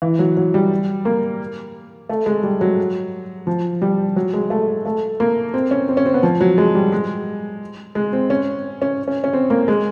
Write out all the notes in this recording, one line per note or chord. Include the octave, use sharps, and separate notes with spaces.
E3
F#3
F#3
G3
A#3
A3
G#3
G3
F#3
F3
G3
F#3
G#3
A3
A3
A#3
C4
C#4
C4
C#4
C4
B3
F3
F#3
G#3
G3
G#3
G#3
C4
C#4
C#4
C#4
C#4
C4
A#3
G#3